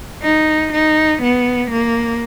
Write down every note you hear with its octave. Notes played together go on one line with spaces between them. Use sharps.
D#4
D#4
B3
A#3